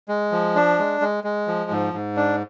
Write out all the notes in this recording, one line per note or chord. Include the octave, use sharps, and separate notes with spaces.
G#3
F3
D4
G#3
G#3
G#3
F3
G#2
G#2
D4